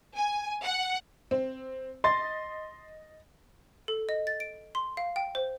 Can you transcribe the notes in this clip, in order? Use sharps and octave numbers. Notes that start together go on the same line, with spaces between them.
G#5
F#5
C4
D#5 C6 A6
A4
D#5
A6
D7
C6
F5
G5
C5